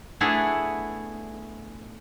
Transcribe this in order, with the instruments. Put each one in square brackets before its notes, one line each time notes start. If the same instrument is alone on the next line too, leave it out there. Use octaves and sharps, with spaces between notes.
[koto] A3 B3 D4 E4 G#4 F#5